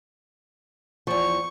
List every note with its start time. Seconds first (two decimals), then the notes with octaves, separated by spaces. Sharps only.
1.07 E2 F3 C#6